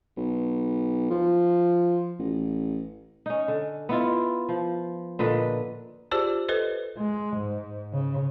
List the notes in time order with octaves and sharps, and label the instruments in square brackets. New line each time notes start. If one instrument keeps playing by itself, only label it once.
[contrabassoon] B1
F3
A1
[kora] C#4 D#4
D3
B3 E4 F4
F3
A#2 D3 B4 D#5
[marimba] F4 G4 G#4 C5 D5 A5
A4 B4 C5 D#5
[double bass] G#3
G#2
C#3